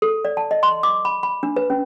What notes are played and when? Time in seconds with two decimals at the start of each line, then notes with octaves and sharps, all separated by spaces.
0.02 A4
0.25 D5
0.37 A5
0.51 D#5
0.63 C6
0.83 D6
1.05 B5
1.23 B5
1.43 D4
1.56 B4
1.70 C#4